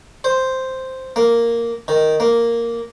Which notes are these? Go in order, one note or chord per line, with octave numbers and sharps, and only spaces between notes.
C5
A#3
D#3
A#3